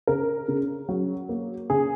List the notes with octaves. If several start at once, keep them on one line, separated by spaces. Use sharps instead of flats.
C#3 A#4
C#3
F#3
A#3
C#3 G#4